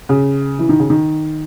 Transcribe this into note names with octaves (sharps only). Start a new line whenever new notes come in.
C#3
E3
D#3
C#3
D#3